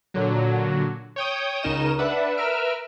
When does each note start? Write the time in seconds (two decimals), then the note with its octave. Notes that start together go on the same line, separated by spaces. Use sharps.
0.14 A#2 D3 F#3
1.16 C#5 G5 D#6
1.63 C#2 C#3 D#4 A#4 D#5 E7
1.99 D4 B4 E5 F#5
2.37 A#4 B4 E5 E6 F6 D7